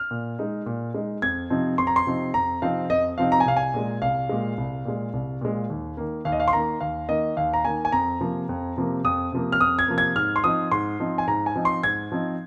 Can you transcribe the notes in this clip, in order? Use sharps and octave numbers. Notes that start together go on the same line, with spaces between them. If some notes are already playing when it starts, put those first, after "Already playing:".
Already playing: F6
A#2
G#3 D#4
A#2
G#3 D#4
F2 G#6
C3 F3 C4 D#4
F2 C6
A#5
C6
C3 F3 C4 D#4
F2 A#5
C3 F3 C4 D#4 F5
F2 D#5
C3 F3 C4 D#4 F5
A#5
G#5
C2 F5
G#5
A#2 G#3
C2 F5
A#2 G#3
C2
A#2 G#3
C2
A#2 G#3
D#2
D#3 A#3
D#2 F5
D#5
F5
C6
D#3 A#3 A#5
D#2 F5
D#3 A#3 D#5
D#2 F5
A#5
D#3 A#3 G#5
G#5
F2 A#5
C3 F3 A#3
F2
C3 F3 A#3
F2 D#6
C3 F3 A#3
F6
F2 D#6
G#6
C3 F3 A#3
G#6
G#2 F6
C6
F3 C4 D#4 D#6
G#2 C6
F3 C4 D#4
G#5
G#2 A#5
G#5
F3 C4 D#4
C6
G#2 G#6
F3 C4 D#4